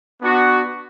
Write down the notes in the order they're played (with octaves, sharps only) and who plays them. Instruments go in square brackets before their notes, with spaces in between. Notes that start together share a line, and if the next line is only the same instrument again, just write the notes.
[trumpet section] B3 D4 F#4